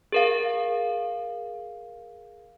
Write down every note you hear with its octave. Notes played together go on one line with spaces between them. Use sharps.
G#4 A#4 F5